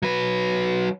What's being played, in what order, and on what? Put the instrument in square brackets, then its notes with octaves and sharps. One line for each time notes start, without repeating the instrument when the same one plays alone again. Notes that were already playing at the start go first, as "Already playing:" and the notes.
[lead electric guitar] F#3 B4